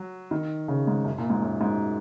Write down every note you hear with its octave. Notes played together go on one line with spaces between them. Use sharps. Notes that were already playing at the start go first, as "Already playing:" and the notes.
Already playing: F#3
D#3
C#3
G#2
F#2
A#2
G#2
F#2
G#2